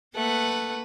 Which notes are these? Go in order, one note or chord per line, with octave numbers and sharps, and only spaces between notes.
A3 A#3 B4 F#5